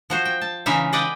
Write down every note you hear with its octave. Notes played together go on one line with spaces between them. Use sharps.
F3 F#4 C5
G5
A5
C#3 E3 G#3 D#4 E5 F5
G#4 B4 D5 D#5 F#5 G5